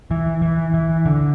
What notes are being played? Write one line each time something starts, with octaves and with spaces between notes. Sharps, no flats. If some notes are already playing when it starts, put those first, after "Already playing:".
E3
E3
E3
D3